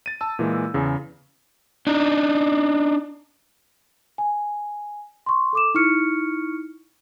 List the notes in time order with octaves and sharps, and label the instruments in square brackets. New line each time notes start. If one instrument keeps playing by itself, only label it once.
[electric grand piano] A6 D#7
A5 E6
A#2 E3 G#3
E2 C#3
[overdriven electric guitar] D4 D#4
[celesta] G#5
C6 C#6
A4 D6 E7
D#4 E4 C#6 F6 C#7